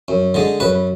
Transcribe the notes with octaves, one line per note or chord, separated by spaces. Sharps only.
F#2
D3 G#3
F#2 B4